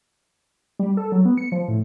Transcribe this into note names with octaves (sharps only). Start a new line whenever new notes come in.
G3
A4
F#3
B3
C#7
F3
A2